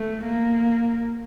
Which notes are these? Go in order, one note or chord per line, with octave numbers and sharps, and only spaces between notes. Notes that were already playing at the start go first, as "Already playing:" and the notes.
Already playing: A3
A#3